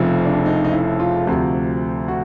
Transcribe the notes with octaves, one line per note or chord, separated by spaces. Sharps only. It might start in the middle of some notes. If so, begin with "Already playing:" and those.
Already playing: F1 F2 C#3 F3
D4
D#4
D#4
E4
F4
D2 C3 F3 F#4
F#4